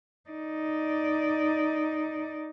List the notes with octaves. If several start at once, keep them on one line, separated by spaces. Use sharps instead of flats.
D#4 D5